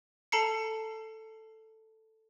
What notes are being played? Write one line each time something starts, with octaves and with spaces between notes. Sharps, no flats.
A4 A5 A#5 C7 C#7